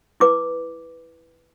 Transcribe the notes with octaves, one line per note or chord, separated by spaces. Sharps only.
E4 B4 D6